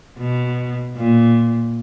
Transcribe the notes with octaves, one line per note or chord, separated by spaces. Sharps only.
B2
A#2